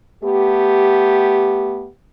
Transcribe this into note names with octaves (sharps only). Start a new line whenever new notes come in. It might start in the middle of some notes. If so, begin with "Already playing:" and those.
A3 B3 G4